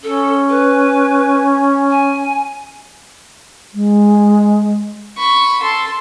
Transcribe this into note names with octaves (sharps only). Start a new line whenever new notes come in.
C#4 A4
B4
G#5
G#3
B5 C#6
A4 C6